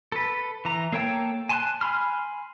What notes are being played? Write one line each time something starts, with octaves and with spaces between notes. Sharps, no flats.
A4 B4
E3 A#5
A#3 A4 C#5 G5 A5
G#5 A5 C6 C#6 F#6
G#5 B5 C6 F6